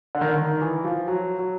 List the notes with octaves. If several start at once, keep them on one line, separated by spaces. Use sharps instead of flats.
D3
D#3
D3
D#3
E3
F3
F#3
F#3